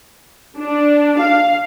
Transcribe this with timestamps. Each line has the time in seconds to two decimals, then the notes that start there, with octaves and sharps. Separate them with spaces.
0.57 D4
1.19 F5